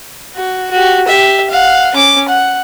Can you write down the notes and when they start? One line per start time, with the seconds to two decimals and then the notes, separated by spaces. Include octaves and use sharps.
0.35 F#4
0.71 F#4 G4
1.07 G4 E5
1.50 F5 F#5
1.95 C#4 D6
2.28 F#5